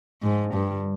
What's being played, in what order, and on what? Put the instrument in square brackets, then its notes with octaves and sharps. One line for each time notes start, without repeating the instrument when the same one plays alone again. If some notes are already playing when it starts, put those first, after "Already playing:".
[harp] F2 [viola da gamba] G#2
[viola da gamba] G2
[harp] D3 G3